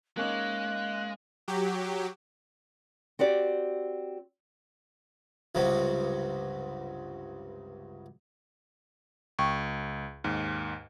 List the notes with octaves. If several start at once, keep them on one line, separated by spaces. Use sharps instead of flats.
G#3 A#3 C#4 D#4 F5 F#6
F#3 G4
C4 F#4 G4 D5
C#2 G2 C3 F#3
C#2 G5 C#6
D#2 G#2